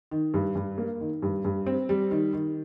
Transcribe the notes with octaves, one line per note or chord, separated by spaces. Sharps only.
D#3
G2
G2
A#3
D#3
G2
G2
C4
G3
D#3
D#3